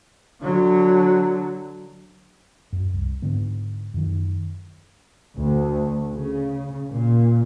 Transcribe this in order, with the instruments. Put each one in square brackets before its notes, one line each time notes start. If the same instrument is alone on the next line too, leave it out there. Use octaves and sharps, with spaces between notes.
[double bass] D3 F#3
[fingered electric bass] F#2
C2
G#2 D3 B3
F#2 D#3
[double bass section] D2
C#3
A#2